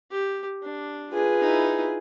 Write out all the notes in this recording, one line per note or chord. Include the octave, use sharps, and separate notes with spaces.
G4
D4
F4 G#4 B4
D#4 E4